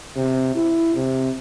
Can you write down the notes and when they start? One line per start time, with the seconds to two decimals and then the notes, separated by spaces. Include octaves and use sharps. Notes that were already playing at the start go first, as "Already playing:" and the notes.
0.16 C3
0.55 E4
0.95 C3